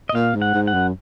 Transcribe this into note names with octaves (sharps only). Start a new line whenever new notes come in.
D#5
A#2 F5
G#2
F#5
G#2
F#5
F#2